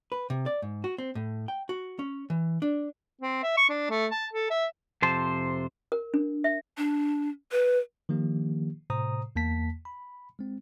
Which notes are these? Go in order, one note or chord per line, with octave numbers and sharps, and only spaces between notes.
B4
C3
D5
G#2
F#4
C4
A2
G5
F#4
C#4
E3
D4
C4
E5
C#6
D4
A3
A5
A4
E5
F2 C3 C5 A5
A#4
D4
E5
D4
B4
D#3 F3 A#3 G4
A2 C3 C5 A#5 D#6
E2 A#3 A5 B6
B5
G#3 C4